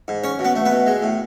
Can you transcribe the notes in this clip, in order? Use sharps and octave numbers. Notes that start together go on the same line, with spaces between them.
G#2
C#4 C#5
B2
B3 B4
A3
B3 B4
B2
G#3
A2